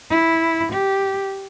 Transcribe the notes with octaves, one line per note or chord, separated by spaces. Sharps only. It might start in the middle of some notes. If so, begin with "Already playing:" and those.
E4
G4